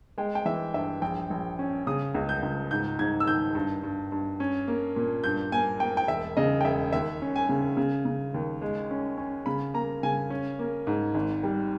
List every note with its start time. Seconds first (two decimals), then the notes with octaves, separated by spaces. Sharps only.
0.18 G#3 G5
0.35 G5
0.45 E3 E5
0.74 G2 E5
1.02 A#1 G5
1.30 A#1
1.59 C#4
1.87 C#3 D#6
2.14 C#2
2.29 G6
2.43 C#2
2.71 G#2 G6
2.99 G#2 G#6
3.20 E6
3.27 D#3 G6
3.55 G2
3.83 G2
4.12 G2
4.40 C#4
4.68 A#3
4.96 A#2
5.24 G2 G6
5.52 A#3 G#5
5.80 A#3 G5
5.97 G5
6.08 E1 E5
6.37 C#3 D#5
6.61 G5
6.65 E1 E5
6.93 D#2 E5
7.22 C#4
7.36 G#5
7.49 C#3
7.77 C#3
8.05 C#3
8.34 D#2
8.62 G#3
8.91 C#4
9.18 C#4
9.46 C#3 B5
9.74 A#3 A#5
10.03 C#3 G#5
10.30 C#4
10.59 A#3
10.87 G#2
11.15 G#1
11.43 G3